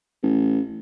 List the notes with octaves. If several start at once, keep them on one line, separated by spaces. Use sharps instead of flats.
A1